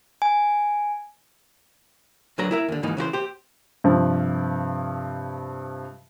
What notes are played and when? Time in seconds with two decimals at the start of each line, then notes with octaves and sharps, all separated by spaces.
0.22 G#5
2.38 D2 D3 F#3 B4 A#5
2.51 E4 A#4 E5
2.69 D#2 D3
2.83 D#2 G#2 E3 A#3 D#4
2.97 C#3 E3 F#4 C5
3.13 G4 C5
3.84 G2 C3 F3